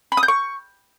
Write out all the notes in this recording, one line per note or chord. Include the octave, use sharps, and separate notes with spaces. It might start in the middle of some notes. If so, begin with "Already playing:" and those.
B5
D#6
G6
C#6